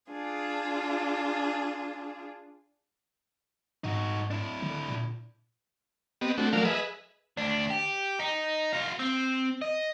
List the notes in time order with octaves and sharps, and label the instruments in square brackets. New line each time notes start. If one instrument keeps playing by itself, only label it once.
[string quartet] D4 F4 G#4
[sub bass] G#2 [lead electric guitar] D#4 F#4
[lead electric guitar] D4 E4
[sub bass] D3
A#2
[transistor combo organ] B3 C4 G4 D#5
A3 C4 D4 F#4
F3 F#3 A3 A#4 D5 F5
G#4 B4 D#5 E5
[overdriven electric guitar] D2 D4
G4
D#4
F#4 F5
C4
D#5